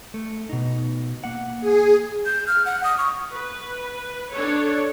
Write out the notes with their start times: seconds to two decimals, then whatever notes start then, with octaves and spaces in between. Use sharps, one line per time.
0.14 A3
0.49 B2 D#4
1.24 A#3 F#5
1.61 G#4
2.26 G6
2.47 F6
2.66 F#5
2.84 D#6
2.98 C#6
3.32 B4
4.32 D4 A4 C#5